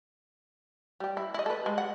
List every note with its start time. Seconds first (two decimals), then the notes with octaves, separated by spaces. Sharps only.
1.00 G3 G4
1.17 E4
1.34 E4 D#5
1.46 A4 B4
1.66 G#3
1.78 F#5